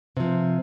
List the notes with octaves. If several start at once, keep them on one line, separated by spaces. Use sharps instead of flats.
C3 F3